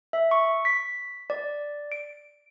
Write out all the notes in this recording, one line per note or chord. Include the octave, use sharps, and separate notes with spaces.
E5
C#6
B6
D5
D7